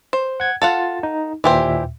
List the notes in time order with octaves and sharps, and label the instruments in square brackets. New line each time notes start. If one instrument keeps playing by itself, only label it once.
[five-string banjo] C5
[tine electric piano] F#5 G#6
[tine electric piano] F4 A6 [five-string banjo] A4 F5 F#5
[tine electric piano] D#4
[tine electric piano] D#2 A#2 E5 [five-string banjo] E3 G4 C5